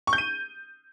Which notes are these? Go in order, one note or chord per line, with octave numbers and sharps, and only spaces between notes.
C#6
G6
D#7